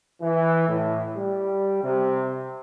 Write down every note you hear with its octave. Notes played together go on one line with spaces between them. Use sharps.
E3
A2
G3
C3